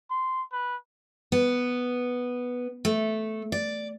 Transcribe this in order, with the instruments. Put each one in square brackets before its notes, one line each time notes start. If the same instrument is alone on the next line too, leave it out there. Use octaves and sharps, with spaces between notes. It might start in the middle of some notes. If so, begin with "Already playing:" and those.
[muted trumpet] C6
B4
[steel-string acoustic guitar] B3
A3
D5